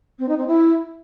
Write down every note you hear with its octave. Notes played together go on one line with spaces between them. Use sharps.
C4
D#4
C4
E4